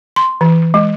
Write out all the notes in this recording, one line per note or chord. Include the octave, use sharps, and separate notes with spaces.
C6
E3
G#3